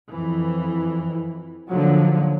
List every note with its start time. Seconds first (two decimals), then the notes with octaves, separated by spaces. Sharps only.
0.10 F2 E3
1.69 D#2 D3 F3 F#3